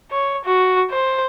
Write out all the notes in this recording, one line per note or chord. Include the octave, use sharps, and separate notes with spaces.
C#5
F#4
C5